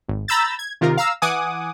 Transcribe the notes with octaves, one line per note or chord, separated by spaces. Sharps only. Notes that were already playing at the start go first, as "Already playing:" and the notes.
G#1
A#5 B5 E6 G6 A6
G#6
C3 D#3 F4 A#4
F5 A#5 E6
E3 F#5 G#5 D6 D#6